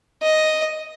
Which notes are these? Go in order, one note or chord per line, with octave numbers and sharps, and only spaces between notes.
D#5